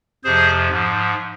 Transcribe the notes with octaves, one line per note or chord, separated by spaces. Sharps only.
F2 C3 F3 G#4 C5
G#2 F3